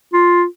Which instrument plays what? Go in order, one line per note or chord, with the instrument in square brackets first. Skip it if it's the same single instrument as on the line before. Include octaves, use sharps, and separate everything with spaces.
[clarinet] F4